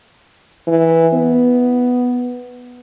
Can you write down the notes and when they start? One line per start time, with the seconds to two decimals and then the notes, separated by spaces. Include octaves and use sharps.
0.67 E3
1.14 B3